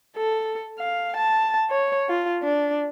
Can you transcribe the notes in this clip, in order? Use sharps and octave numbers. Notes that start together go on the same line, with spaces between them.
A4
F5
A5
C#5
F4
D4